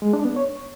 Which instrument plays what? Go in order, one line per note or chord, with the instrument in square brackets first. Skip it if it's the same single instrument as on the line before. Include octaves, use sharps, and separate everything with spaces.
[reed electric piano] G#3
D4
B3
C#5